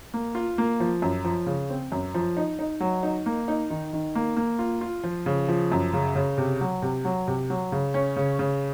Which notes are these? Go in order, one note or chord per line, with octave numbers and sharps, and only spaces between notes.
A#3
F4
A#3
F3
F#2
F3
C#3
C4
F#2
F3
D#4
D#4
F#3
D#4
A#3
D#4
D#3
D#3
A#3
A#3
F4
F4
F3
C#3
F3
F#2
C#3
C#3
C3
F#3
C3
F#3
C3
F#3
C#3
C#4
C#3
C#3